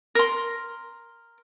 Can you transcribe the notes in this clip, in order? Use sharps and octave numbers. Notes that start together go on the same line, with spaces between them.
A#4 C6